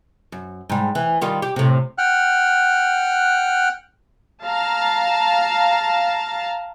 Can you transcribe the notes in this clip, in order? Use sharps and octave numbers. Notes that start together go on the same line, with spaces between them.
F#2
G#2 G3
E3
D#3 G3 F4
G4
A2 C3
F#5 G5 F6 F#6
F5 A5 A#5